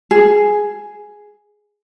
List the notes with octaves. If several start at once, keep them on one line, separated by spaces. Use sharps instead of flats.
G#4